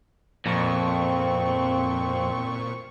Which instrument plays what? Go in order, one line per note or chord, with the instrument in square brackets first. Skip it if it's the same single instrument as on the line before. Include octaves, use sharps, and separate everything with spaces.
[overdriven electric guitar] F2 [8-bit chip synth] A#2 C#6 [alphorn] C4